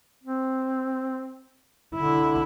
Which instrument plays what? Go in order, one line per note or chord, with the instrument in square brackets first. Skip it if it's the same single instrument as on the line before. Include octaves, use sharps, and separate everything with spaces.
[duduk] C4
[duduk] D3 [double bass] E4